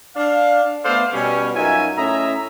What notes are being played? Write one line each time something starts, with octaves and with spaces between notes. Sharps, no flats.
D4 F5
A3 B3 A4 C5 D5 F5
B2 G3 C#4
F#2 D#4 F4 F#4 E5 G#5
A2 C#4 D#5 E5 A#5